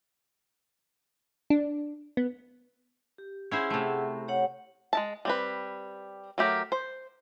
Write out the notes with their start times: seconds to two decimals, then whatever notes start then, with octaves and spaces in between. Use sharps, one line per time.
1.50 D4
2.17 B3
3.18 G4
3.51 C#4 E4 G#4 C5 F#5
3.70 C3 A3
4.28 G4 C#5 F#5
4.93 G#3 E4 A5
5.25 G3 C4 B4
6.38 F#3 A3 G4 A#4
6.72 C5